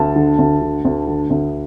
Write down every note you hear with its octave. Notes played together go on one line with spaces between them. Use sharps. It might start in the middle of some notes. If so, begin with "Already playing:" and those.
Already playing: D2 A5
D3
D2
D3
D2
D3
D2